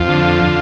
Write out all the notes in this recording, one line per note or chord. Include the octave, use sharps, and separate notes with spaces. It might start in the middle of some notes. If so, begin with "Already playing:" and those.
Already playing: F2 F4
D3